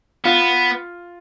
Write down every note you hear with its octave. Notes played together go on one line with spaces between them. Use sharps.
B3 F4